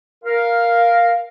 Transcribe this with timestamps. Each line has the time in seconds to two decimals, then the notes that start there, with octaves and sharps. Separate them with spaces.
0.24 A#4 F5